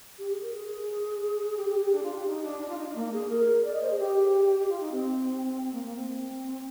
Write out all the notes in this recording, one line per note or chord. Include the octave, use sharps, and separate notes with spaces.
G4
G#4
A#4
G#4
G4
G4
G4
D4
F4
G4
D#4
D4
D4
F4
D#4
D4
A#3
G#4
A#4
D5
D#5
C5
G#4
G4
G4
F4
D#4
C4
A#3
A#3
C4